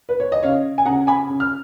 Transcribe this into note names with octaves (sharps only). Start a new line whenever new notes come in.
B4
C#5
D#5
C#3 C#5 F5
G#5
C#3 F#5 A#5
G#5 B5
C#3
F6